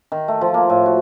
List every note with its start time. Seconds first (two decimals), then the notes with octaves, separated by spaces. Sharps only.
0.12 D#3
0.28 A3
0.41 F3
0.54 A#3
0.70 A2
0.86 F#4